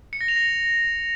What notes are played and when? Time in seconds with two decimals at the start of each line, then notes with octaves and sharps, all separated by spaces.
0.13 C#7
0.21 A#6
0.28 F7
0.36 A#6